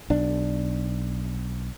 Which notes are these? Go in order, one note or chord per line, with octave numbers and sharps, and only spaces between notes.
B1 D4